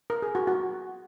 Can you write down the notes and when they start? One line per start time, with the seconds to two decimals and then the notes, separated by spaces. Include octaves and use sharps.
0.10 A#4
0.22 G#4
0.35 F#4
0.47 F#4